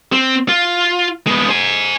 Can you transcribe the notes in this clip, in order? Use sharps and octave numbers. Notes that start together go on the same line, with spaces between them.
C4
F4
G#3 B3
C5 G#5